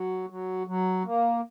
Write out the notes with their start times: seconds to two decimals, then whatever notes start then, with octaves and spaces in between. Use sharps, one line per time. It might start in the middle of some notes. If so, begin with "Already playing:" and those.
Already playing: F#3
0.30 F#3
0.67 F#3
1.05 A#3